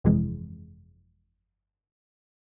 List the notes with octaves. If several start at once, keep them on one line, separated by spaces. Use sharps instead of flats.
G1 F2 C3 E3 G#3